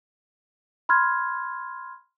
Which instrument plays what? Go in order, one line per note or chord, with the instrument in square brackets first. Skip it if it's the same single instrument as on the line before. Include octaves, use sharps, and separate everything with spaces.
[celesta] B5 C6 F6 G#6